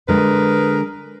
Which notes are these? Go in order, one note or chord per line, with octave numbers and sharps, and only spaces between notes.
D3 G#3 G#4 A#4 B4